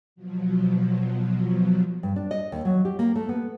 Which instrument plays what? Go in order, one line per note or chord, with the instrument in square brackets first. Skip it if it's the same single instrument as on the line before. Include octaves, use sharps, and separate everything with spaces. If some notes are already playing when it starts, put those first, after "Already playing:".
[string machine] B2 F3 F#3
[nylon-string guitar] G2
D4
D#5
D#2
F#3
G4
A#3
A3
B3